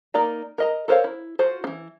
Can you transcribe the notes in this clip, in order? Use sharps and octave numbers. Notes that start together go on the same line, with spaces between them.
A#3 D#4 A#4 D5 A#5
A#4 D#5 A#5
A4 A#4 C5 C#5 F5
E4
F4 F#4 C5
E3 C4